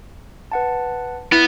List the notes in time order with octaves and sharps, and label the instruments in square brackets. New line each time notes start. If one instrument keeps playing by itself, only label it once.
[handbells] B4 F#5 A5
[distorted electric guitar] B3 [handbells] E4